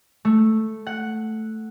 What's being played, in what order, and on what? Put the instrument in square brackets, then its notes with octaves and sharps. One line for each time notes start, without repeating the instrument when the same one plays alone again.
[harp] A3
F#5